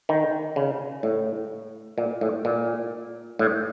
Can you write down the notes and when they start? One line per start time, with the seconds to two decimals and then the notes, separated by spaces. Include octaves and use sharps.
0.09 D#3
0.56 C#3
1.03 A2
1.98 A#2
2.21 A2
2.45 A#2
3.39 A2